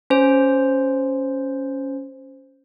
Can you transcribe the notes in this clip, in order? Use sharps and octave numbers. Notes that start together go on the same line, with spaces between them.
C#4 C5